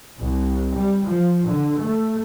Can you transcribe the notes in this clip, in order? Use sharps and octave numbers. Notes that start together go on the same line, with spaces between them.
C2
G3
F3
D3
A3